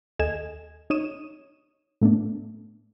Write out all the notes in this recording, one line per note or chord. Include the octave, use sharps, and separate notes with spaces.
D#2 A4 D#5 G#5 G#6 E7
D#4 C#5 C#6 D#6 D#7 E7
A2 A3 B3 D4